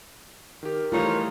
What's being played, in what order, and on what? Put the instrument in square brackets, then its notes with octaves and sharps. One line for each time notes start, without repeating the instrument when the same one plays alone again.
[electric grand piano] D#3 G4 [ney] A#4
[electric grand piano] E3 G3 A3 [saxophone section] D#4 C5 C#5 [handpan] F4